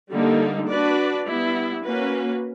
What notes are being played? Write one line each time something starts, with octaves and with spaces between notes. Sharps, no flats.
D3 G3 A#3 D#4
D4 F#4 B4 D5
G3 B3 E4
A#3 C#4 F#4 B4